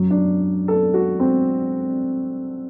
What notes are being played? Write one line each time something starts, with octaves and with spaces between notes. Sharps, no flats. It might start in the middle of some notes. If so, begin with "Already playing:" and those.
Already playing: F#2 F#3
D4
A4
F#4
C4